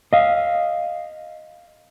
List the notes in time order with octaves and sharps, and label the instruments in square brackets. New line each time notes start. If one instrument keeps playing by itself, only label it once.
[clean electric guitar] D#5 F5